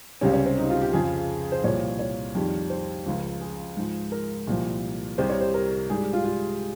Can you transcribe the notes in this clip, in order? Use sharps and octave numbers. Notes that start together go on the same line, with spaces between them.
C#2 C3 G3 C#4
C#4
C4
D#4
F4
G4
F2 C#3 F3 G#4
C5
C2 A#2 F3 C#5
C#5
F2 D#3 G3
C5
C#2 C#3 F3
G#4
G#2 F3
A#4
C2 A#2 F3
C2 C3 G3 C5
C#5
C5
A#4
G#2 G3 G#4
G4
F4
F4